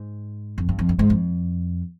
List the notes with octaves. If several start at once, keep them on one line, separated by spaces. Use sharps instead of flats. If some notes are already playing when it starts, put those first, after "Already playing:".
Already playing: G#2
F2
G2
F2
G2
G#2
F2